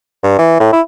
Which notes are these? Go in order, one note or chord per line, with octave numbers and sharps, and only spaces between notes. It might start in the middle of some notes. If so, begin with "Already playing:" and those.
G2
E3
A2
E4